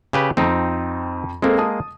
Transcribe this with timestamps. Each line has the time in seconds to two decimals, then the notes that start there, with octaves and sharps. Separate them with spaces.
0.13 C#3 G4 B4
0.37 F2 F3 C4 D#4
1.42 G#3 A#3 C4 A4
1.58 A5 D#6